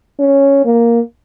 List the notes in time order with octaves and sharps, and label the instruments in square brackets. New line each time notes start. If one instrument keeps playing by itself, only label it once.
[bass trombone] C#4
A#3